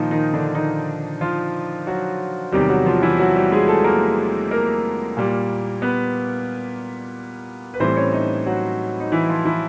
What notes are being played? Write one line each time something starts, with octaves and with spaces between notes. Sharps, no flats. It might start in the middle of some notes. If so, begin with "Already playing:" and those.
Already playing: A#2 D#3 F3 D#4
D#3 D#4
D3 D4
D#3 D#4
F3 F4
F#3 F#4
E2 C3 D#3 F#3 G3 G4
F#3 F#4
F3 F4
E3 E4
F#3 F#4
G3 G4
G#3 G#4
A3 A4
A#3 A#4
A#3 A#4
A#2 G3
B3 B4
B4
A2 E3 G3 C4 C5
C#4 C#5
D#4 D#5
F#3 F#4
D#4
E3 E4
F3 F4
E3 E4